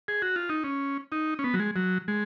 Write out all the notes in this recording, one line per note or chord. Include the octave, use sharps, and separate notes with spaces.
G#4
F#4
F4
D#4
C#4
D#4
C#4
B3
F#3
G#3
F#3
G#3